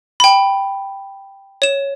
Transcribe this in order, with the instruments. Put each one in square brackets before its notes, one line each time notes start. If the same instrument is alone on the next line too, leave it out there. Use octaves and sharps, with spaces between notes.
[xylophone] G5 B5
C#5 E7